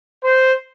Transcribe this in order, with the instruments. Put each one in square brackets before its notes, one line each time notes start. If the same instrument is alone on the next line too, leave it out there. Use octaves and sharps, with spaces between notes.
[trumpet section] C5